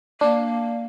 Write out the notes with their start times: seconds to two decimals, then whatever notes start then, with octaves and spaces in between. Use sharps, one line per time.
0.21 A#3 D4